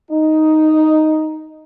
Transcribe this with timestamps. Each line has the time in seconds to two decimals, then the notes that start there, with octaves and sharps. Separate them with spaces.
0.11 D#4